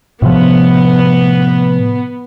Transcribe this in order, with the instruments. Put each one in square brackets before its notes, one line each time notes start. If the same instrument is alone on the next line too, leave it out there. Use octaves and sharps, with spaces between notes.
[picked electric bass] A2 C3 F3 [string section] B3